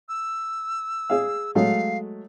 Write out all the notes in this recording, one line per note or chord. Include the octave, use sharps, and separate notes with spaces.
E6
G#4 F5
F#3 G#3 A3 F5